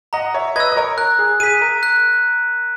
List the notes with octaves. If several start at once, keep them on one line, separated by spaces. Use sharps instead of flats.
D#5 F#5 A#5
C#5 E5
B4 D#5 E6 G#6
D#5
A#4 C#5
A#4 F#6
G#4
G#4 B6 D#7
A#4
F#6